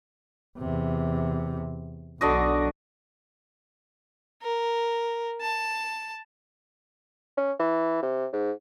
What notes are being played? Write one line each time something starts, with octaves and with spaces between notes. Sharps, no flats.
E2 C3
B1 D3 F#3 F#4 D#5
A#4
A5
C#4
E3
C3
G#2